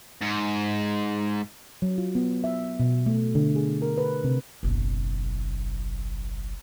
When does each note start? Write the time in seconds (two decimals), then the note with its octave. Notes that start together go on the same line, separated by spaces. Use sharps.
0.21 G#2
1.82 F#3
1.98 F4
2.15 B3
2.44 E5
2.80 B2
3.06 A3
3.35 D3
3.56 G#4
3.82 A#4
3.98 B4
4.24 C3
4.63 F#1 B1